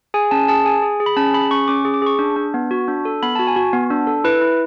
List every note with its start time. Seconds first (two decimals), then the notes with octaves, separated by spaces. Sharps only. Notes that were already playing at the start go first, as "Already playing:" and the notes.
0.14 G#4 G#5
0.31 C#4 A5
0.48 G#4 A5
0.65 G#4 G#5
0.83 G#4
1.00 G#4
1.06 B5
1.16 C#4 A5
1.34 G#4 B5
1.51 C#4 C#6
1.68 C#4 D6
1.85 G#4
1.94 D6
2.02 G#4 C#6
2.19 D4
2.36 D4
2.54 B3
2.71 F#4
2.88 D4
3.05 A4
3.23 B3 B5
3.35 A5
3.39 F#4
3.47 G#5
3.56 F#4
3.73 B3
3.91 D4
4.07 A4
4.24 E4 B4
4.41 E4